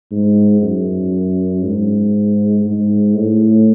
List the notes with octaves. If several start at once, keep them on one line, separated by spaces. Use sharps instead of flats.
G#2
F#2
G#2
G#2
A2